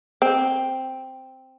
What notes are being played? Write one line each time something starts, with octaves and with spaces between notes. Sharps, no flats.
C4